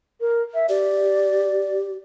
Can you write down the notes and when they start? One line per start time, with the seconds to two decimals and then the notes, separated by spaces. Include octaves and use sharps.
0.21 A#4
0.54 E5
0.69 G4 D5